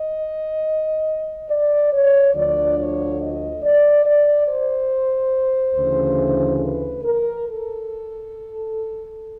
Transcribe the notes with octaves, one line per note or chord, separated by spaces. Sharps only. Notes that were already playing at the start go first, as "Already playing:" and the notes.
Already playing: D#5
D5
C#5
D2 D3 F3 D5
C#5
D#5
D5
D5
C5
D2 C#3 E3
B4
A#4
A4